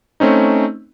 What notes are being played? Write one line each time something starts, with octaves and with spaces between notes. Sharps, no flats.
A3 C4 C#4 D#4